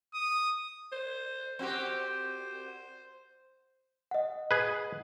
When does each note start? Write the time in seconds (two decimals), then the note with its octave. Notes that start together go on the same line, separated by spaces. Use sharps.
0.14 D#6
0.92 C5
1.59 C4 F#4 G4 C5
4.11 D#5 F#5
4.51 G#4 B4